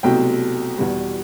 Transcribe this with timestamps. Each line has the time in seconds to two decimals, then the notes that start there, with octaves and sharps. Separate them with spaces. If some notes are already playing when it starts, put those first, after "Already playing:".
0.03 C2 B2 F#3 A3 C4 G5
0.78 E2 B2 G3